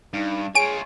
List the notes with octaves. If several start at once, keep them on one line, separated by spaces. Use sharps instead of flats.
G2 D#4
F4 G#4 C#5 G#5 D7